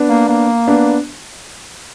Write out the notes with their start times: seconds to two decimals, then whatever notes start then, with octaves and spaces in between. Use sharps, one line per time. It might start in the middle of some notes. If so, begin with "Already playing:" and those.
Already playing: B3 D4
0.09 A#3
0.29 A#3
0.67 B3 D4